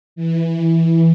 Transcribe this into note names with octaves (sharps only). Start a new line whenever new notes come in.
E3